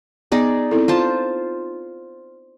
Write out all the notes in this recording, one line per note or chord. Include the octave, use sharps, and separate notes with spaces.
B3 D#4 G#4 D5
C4 E4 A4
F4 C5 A5